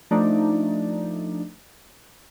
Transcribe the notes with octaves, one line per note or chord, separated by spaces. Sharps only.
F3 A3 D4 D#4 D5